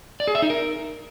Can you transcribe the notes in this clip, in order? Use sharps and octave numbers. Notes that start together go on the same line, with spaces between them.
D5
G#4
E5
D#4
A#4